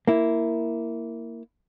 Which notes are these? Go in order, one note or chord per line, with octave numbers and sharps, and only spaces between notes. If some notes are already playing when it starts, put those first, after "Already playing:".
A#3 E4